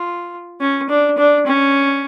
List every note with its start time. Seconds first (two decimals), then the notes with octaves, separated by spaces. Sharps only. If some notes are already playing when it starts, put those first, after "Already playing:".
Already playing: F4
0.61 C#4
0.89 D4
1.18 D4
1.47 C#4